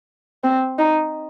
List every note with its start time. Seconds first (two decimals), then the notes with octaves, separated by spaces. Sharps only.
0.44 C4
0.78 D#4